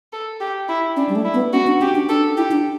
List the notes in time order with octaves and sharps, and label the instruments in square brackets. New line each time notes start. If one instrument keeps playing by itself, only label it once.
[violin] A4
G4
E4
[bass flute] C#4 [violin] D4
[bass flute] G3
A3
[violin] E4
[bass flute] B3
[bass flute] C#4 [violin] F#4
[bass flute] D4
[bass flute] C#4 [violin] G4
[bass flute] D4
[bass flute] D4 [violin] A4
[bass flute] E4 [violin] G4
[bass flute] D4